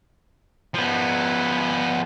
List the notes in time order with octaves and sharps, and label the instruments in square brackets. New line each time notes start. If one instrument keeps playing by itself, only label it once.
[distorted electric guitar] F3 B3